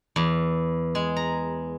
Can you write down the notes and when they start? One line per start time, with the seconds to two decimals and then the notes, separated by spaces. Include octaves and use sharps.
0.16 E2
0.95 G#3
1.16 A#5